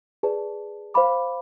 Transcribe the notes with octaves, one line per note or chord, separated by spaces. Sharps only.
G#4 B4 D5 A5
C5 F5 B5 D6